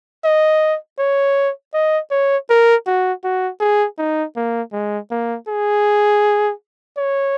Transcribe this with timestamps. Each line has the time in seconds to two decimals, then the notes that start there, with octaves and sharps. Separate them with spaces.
0.25 D#5
0.99 C#5
1.74 D#5
2.11 C#5
2.50 A#4
2.87 F#4
3.24 F#4
3.61 G#4
3.99 D#4
4.36 A#3
4.73 G#3
5.11 A#3
5.48 G#4
6.97 C#5